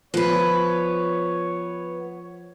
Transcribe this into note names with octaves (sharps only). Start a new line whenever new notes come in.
F3 B3 B4 C#5